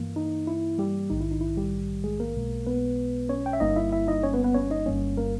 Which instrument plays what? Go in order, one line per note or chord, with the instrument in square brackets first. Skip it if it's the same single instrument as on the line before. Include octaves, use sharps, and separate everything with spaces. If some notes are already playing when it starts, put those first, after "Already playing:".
Already playing: [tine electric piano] G2 E3 A#3
D#4
E4
G3 G4
A#1 G#2 D#3 D#4
E4
D#4
E4
G3 G4
G#3 G#4
A#3 A#4
B1 B2 G#3
B3 B4
C#4 C#5
G5
E5
G1 G2 G3 A#3 D#4 D#5
E4 E5
E4 E5
D#4 D#5
C#4 C#5
B3 B4
B3 B4
C#4 C#5
D#4 D#5
G1 G2 G3 A#3 C#4 C#5
A#3 A#4